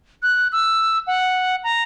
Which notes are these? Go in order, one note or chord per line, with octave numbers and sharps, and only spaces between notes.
F#6
E6
F#5
A#5